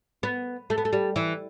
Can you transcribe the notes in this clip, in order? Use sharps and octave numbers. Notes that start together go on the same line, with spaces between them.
B3
A3
B3
A3
G3
E3